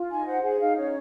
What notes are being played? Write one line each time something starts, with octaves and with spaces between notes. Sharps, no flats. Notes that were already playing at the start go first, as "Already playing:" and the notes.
Already playing: F4
D#4 G#5
C5 F#5
G#4 F#5
D#4 F5
C#4 C#5